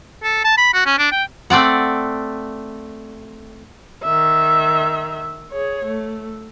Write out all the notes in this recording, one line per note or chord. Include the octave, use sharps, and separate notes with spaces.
A4
A5
B5
F#4
C#4
D4
G5
A3 C4 D5 F#5
D#3 E5
G#4 C#5
A3